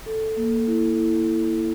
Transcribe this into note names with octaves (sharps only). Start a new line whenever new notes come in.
A4
A#3
E4
E4